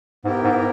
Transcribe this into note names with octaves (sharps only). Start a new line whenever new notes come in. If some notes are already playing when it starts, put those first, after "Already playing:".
G#2 B3 E4 G4 A#4
G#2